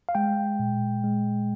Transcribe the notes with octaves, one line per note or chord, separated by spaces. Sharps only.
F5
G#3 G5
A#2
G#3